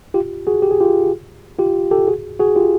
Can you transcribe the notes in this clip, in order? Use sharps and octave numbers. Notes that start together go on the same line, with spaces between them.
F4 G4
F#4 G#4
G4
G#4
F4 G4
F4 G4
G4 A4
F#4 G#4
F#4 G#4
F4 G4